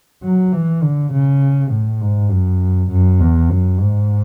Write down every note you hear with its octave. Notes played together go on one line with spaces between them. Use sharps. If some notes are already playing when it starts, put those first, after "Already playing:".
F#3
E3
D3
C#3
A2
G#2
F#2
F#2
E2
F#2
G#2